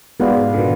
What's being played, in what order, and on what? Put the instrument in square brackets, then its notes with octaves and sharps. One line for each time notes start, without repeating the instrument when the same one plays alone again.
[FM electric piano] G#2 B2 [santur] B3 F4 G#4 D5
[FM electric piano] D3
B2 D#3